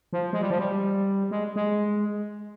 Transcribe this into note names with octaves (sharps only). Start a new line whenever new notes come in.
F3
G#3
G3
F3
G3
G#3
G#3